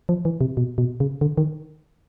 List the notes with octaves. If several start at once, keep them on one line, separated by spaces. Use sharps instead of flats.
F3
E3
C3
B2
B2
C#3
D3
D#3